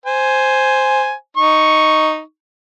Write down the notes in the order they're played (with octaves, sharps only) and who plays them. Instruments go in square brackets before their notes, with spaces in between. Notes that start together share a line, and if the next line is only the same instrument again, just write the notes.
[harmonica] C5 G#5
D#4 C#6